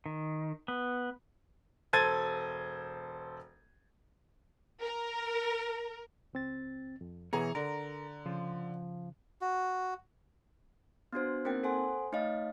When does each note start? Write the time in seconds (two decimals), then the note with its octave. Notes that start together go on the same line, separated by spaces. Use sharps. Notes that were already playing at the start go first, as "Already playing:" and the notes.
0.06 D#3
0.68 B3
1.93 E1 A4 C5 G#6 A6 D#7
4.81 A#4
6.33 C#2 C4 A6
7.01 F2
7.33 B2 E3 B3 G#4 C#5 A#5
7.55 D3 A#4 A#5
8.26 C#3 F3
9.41 F#4
11.13 B3 D4 F#4 C5
11.45 A#3 C4 D#4 A#4 C5 G5
11.63 A4 C5 F#5 G#5 C6
12.12 A3 D#4 C#5 D#5 F5